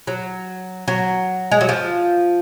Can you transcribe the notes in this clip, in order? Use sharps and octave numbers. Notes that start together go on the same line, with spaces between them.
F#3
F#3
G#3
F#3
F3